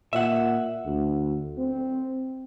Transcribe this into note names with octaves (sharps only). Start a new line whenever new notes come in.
A#2 E5 F#5
D2
C4